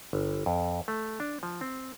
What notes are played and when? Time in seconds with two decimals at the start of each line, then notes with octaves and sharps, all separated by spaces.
0.13 G1
0.46 F2
0.88 A3
1.20 D4
1.43 F3
1.61 C4